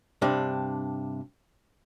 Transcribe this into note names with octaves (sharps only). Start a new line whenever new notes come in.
G2 C3 D4